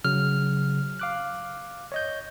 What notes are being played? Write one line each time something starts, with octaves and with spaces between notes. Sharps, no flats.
C#3 F#3 F6
F5 D6 F#6
C#5 D#5 G6